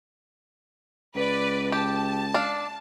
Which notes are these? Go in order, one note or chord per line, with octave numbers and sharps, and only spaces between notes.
C#2 B4 D5
G4 A5
D4 F5